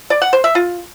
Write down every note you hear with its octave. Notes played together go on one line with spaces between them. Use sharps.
D5
F#5
C5
E5
F4